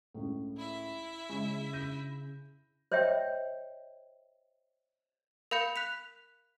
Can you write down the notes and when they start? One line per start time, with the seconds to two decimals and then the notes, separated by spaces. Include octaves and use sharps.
0.14 C#2 A2
0.57 E4 E5
1.30 C#3 G#3
1.73 G6 A#6 D#7
2.92 C5 C#5 D#5 E5 G5
5.51 A#4 F5 B5 G6 C#7
5.76 F#6 B6 F7